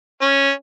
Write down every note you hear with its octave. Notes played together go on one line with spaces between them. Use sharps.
C#4